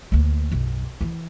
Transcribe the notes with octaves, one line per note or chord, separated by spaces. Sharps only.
D2 A#3
B1 F#2
E3 E4